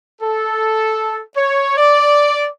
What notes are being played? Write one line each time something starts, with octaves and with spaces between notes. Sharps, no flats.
A4
C#5
D5